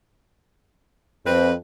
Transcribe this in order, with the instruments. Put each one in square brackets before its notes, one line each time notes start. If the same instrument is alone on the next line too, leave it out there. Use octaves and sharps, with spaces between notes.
[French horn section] F2 [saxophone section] C4 B4